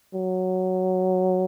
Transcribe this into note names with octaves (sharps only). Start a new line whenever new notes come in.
F#3